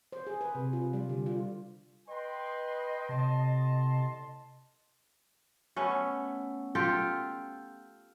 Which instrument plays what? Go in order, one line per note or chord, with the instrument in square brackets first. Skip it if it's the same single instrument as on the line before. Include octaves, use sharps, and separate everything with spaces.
[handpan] C5
G#4
B4
C3
F4
G3
D3
F4
[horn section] B4 G5 C6 [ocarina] D#5
[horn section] A2 A5 C6 [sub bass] C3
[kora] A3 B3 C#4
F4 G4 A4 G5